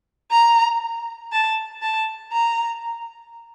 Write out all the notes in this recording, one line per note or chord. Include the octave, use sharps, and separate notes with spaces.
A#5
A5
A5
A#5